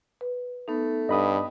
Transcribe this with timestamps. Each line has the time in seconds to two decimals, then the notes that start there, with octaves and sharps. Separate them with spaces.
0.21 B4
0.68 A3 B3 D#4
1.09 G2 D#5 B5 D#6